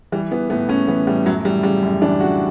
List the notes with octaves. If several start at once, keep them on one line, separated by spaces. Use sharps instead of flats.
E3 G3
E3 B3
A2 B3
A2 C#4
E3 B3
A2 G3
F#2 F#3
E3 G3
C#3 G3
F#2
E3 D4
C#3 F#4